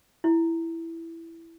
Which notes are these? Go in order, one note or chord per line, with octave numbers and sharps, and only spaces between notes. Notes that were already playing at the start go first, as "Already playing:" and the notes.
E4